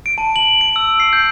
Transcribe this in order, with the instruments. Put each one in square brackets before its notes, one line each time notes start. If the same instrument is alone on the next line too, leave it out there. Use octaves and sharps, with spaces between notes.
[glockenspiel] D7
A5
F#7
D7
E6
C7
G6